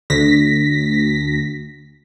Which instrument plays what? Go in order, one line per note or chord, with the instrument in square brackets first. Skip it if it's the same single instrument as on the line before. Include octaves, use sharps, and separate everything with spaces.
[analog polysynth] D2 A#6 B6